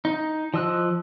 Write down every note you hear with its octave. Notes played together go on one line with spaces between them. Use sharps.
D#4
F3 D#5 E6 F#6